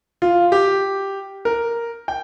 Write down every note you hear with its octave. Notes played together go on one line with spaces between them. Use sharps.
F4
G4
A#4
G5